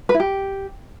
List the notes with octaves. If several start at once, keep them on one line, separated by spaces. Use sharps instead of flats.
B4
E4
G4